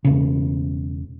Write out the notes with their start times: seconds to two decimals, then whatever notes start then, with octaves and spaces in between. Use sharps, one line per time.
0.05 E1 C#3